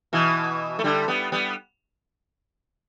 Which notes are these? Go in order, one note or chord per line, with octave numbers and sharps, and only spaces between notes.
B2 E3
A3
D3 G3
G3 B3
G3 B3